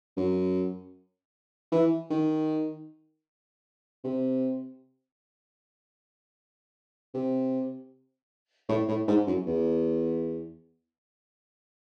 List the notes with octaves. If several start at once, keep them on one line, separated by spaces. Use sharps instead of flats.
F#2
E3
D#3
C3
C3
A2
A2
G#2
F#2
E2